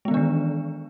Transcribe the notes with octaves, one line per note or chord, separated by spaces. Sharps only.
D#3 E3 G#3 B3 D4